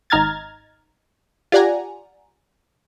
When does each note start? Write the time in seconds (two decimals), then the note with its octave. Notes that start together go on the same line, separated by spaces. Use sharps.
0.10 G#1 D#4 A#5 F6 G#6 A6
1.52 F4 G4 D5 F#5 G#5 A#5